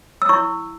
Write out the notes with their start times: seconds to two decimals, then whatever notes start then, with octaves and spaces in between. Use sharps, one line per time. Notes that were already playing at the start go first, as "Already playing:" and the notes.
0.22 E6
0.29 E4 C#6